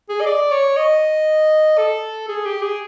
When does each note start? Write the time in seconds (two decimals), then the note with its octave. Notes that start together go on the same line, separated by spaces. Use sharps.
0.10 G#4
0.21 D#5
0.26 D5
0.51 C#5
0.77 D#5
1.78 A4
2.28 G#4
2.46 G4
2.62 G#4